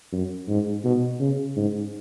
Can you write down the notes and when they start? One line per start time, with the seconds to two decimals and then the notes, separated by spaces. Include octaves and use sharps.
0.13 F#2
0.49 G#2
0.85 B2
1.20 C#3
1.56 G#2